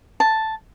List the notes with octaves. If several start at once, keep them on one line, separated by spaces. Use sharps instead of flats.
A5